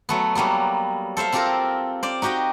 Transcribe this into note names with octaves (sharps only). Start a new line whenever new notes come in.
F#3 A3 B3
F#3 G3 A#3 B3
A4 C5 E5 F5
C4 F4 G4 A4 A#4 A#5
C5 D5 F5
D#4 F#4 G4 D#5 G5